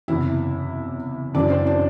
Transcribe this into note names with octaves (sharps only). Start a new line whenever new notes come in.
F#1 E2 C3 E4 E5
F#1 F#2 E3 D4 D5
C4 C5
D4 D5